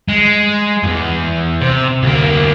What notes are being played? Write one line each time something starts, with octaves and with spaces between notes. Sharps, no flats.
G#3
E2 G2
C3
D2 A#3